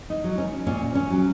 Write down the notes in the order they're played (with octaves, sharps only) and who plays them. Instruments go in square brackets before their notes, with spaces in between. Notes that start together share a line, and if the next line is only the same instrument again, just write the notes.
[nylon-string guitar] D#4
F#3
C#4
A#2 C#4
C#4
F#3